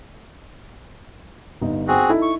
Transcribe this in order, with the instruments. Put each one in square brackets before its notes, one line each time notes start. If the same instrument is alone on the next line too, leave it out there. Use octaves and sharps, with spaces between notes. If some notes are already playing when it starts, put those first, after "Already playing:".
[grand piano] G1 D#4
[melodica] C4 F#4 G#4
[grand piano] D#4 E4 A4
[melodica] C#6